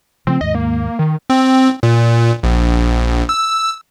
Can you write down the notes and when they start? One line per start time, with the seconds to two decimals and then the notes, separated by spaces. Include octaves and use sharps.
0.27 C#3 F3 A3 C4
0.41 D#2 G#2 D#5
0.55 A#3
0.99 D#3
1.30 C4
1.83 A#2
2.43 A#1
3.29 E6